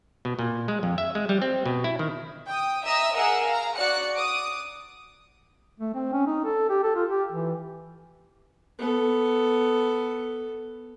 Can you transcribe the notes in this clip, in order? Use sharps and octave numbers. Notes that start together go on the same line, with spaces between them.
B2
A#2
G#3
F2
E5
G#3
G3
C4
B2
E4
D#3
G5 D#6
D#5 E5 A#5 D#6 E6
G#4 A#4 D#5 F#5 E6
F5 A#5
F#4 D5 F#6 C#7
D6 D#6
A3
C4
C#4
D#4
A4
G4
A4
F4
G4
E3
B3 A4